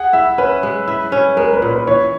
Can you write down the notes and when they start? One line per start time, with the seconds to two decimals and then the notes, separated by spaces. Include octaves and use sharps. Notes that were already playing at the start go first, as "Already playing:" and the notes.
Already playing: G#4 F#5
0.13 E4 E5
0.38 C#4 B4
0.63 G#3
0.87 E4
1.12 C#4
1.37 G#3 A#4
1.53 B4
1.62 A#2
1.71 B4
1.87 E3 C#5